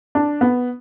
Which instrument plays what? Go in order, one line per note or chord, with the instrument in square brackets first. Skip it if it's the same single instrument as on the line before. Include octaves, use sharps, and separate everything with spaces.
[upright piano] D4
B3